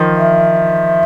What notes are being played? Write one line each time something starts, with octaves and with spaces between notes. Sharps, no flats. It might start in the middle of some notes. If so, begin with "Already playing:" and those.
Already playing: D#3 F3
E5